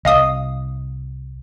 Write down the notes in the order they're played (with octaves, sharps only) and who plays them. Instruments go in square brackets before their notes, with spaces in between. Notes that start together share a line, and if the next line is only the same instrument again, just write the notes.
[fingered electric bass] C2 [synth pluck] D#5 F5 D#6